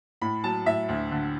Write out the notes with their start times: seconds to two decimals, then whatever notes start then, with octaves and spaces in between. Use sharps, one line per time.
0.22 A2 B5
0.44 F#3 A5
0.66 A2 E5
0.89 D2
1.11 D3